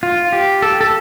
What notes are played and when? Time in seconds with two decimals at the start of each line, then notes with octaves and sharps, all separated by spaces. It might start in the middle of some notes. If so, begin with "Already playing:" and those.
0.03 F4
0.33 G4
0.62 A4
0.81 A4